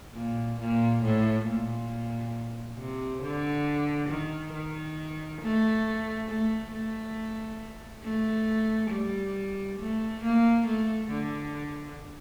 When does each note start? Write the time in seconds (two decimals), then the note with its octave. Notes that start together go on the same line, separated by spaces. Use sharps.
0.15 A#2
0.59 A#2
1.03 A2
1.46 A#2
2.78 C3
3.22 D3
4.09 D#3
4.54 D#3
5.41 A3
6.28 A3
6.72 A3
8.03 A3
8.91 G3
9.79 A3
10.23 A#3
10.66 A3
11.10 D3